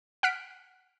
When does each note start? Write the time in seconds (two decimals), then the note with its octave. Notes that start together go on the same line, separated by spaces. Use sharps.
0.23 F#5 F6 B6 D7